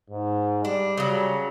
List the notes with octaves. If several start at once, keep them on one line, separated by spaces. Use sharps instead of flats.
G#2
G3 D4
C#3 F#3